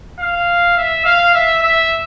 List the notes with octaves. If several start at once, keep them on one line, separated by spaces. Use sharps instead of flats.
F5
E5
F5
E5
E5